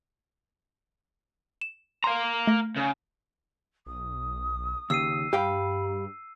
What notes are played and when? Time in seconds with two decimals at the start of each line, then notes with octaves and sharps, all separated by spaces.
1.61 E7
2.04 F5 A#5 C6
2.47 A3 A#6
2.77 C#3
3.86 B1 D#6
4.90 D#2 C#3 E6 C7 D#7
5.33 G2 G4 F5 G5 B5